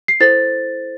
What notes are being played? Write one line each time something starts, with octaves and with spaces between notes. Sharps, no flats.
C7
E4 A4 C5 A6